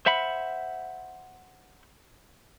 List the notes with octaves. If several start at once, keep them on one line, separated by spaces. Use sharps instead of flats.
C5 E5 F#5 B5